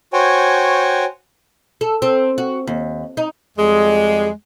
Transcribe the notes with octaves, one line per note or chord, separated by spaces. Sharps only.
F#4 C5 C#5 G5 G#5
A4
C4
F#4
D#2
D#4
F2 G3 G#3